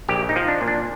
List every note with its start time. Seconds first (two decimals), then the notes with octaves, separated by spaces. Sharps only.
0.09 A#1 G4
0.29 D#4
0.36 F3
0.48 D4
0.61 A#2
0.68 D4